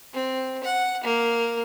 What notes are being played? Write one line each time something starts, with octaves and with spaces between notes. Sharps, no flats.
C4
F#5
A#3